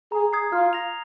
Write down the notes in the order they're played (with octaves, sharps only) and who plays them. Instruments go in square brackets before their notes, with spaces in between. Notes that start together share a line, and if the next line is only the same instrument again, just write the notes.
[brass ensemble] G#4 [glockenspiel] A#5
[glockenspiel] D#6 G#6 C7
[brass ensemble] F4 [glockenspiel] F6
[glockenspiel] A#6 F7